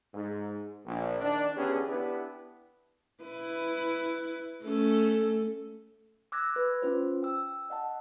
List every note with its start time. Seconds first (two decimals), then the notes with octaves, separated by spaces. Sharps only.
0.14 G#2
0.86 A#1
1.21 D#3 D4
1.56 D3 E3 B3 C#4 G4 G#4
1.88 B3 D4 E4 G4 B4
3.24 E4 B4
4.63 A3 C#4 A4
6.32 D6 E6 F#6 G#6 A#6
6.56 B4
6.82 C#4 F4 C5
7.23 G5 E6
7.70 D#5 F#5 A5